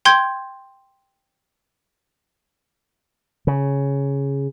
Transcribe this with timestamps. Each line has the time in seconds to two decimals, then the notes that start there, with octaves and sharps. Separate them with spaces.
0.05 G5 C6 G6 G#6
3.47 C#3